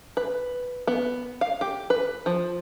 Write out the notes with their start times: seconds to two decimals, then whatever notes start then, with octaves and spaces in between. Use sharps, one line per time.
0.17 B4
0.87 B3
1.41 F5
1.61 G4
1.90 B4
2.26 F3